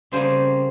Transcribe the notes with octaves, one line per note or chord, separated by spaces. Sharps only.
F2 C#3 G3 A#3 C5